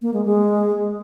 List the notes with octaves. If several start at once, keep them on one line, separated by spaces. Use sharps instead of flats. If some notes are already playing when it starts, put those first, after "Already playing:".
A#3
G#3
G#3